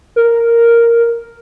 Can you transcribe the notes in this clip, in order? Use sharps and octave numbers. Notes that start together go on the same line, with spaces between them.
A#4